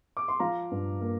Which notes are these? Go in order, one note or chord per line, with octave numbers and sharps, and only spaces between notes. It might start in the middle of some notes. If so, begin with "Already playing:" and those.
D6
C6
F3 F5 A#5
G2
A#3